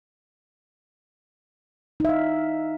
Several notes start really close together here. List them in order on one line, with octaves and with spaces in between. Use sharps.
D#4 E5 F5